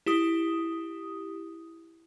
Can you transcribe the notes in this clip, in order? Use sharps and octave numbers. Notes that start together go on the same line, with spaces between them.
E4 G4 D#6